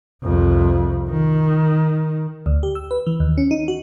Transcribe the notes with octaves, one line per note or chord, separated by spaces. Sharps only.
C2 F2
D#3
D2
G4
E6
B4
E3
D#2
C#4
D#4
F#4